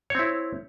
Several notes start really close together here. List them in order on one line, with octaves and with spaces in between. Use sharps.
C#5 C4 E4